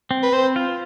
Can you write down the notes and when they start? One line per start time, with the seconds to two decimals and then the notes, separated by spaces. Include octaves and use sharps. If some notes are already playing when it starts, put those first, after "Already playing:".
0.11 C4
0.23 B4
0.32 C4 C5
0.56 F4